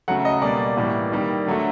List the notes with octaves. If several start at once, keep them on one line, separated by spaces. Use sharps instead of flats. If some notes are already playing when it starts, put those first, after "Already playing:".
C#3 F#3 A3 F#5
D#5
B2 G3 A#3 D5
A2 E3 G3 A#3
D#3 G3 A#3
D3 F#3 A3